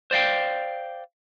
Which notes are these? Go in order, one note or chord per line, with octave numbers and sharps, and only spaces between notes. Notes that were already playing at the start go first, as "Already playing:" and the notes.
C5 D5 F5 G5